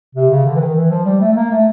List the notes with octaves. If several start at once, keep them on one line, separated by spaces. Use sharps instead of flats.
C3
C#3
D3
E3
D#3
E3
F3
G3
A3
A3
A#3
A3